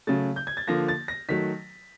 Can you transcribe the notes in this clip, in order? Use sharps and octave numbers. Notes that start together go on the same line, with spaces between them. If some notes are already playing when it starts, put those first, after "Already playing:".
C#3 F#3 A3 A6
G6
G#6
A6
D3 F3 A#3 A#6
A6
A#6
D#3 F#3 A3 B6